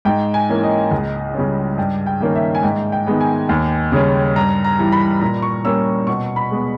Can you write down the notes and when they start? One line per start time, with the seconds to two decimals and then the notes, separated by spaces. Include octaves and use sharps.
0.05 G#2 G5
0.34 G#5
0.49 E3 A#3 C#4
0.63 D#5
0.91 C#2
1.34 C#3 G3 C#4
1.78 G2 G5
2.06 G5
2.20 D#3 A#3 C#4
2.35 E5
2.55 G#5
2.63 G#2 G5
2.92 G5
3.07 D#3 G#3 B3
3.21 G#5
3.49 D#2
3.92 C#3 G3 C#4
4.36 G2 A#5
4.64 A#5
4.79 E3 G3
4.92 B5
5.21 A#2 A#5
5.42 C#6
5.65 G3 A#3 C#4 E6
6.07 B2 C#6
6.36 B5
6.51 G#3 B3